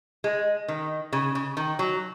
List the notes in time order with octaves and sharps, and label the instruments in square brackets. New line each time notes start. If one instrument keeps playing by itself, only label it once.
[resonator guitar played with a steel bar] G#3
D#3
C#3
C#3
D#3
F#3